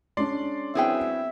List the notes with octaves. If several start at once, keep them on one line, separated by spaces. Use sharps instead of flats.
G#3 C#4 D4 D5 C6 C7
F#3 B3 C4 E4 G#4 E5 G5